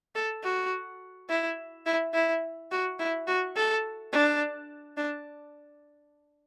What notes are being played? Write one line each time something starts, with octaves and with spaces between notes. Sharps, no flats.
A4
F#4
E4
E4
E4
F#4
E4
F#4
A4
D4
D4